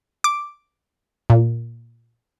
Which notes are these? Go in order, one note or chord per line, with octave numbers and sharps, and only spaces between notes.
D6
A#2